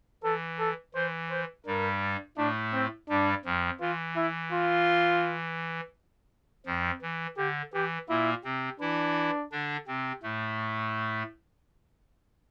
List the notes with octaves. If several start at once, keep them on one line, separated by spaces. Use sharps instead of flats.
E3 A4
A4
E3 C5
C5
G2 G3 A#4
A2 A3 D4
C4
G2 G3 D4
F2 F3
E3 F4
E4
F4
F2 F3
E3
D3 G4
E3 G4
A#2 A#3 E4
C3 C4
E3 D4 E4
D3 D4
C3 C4
A2 A3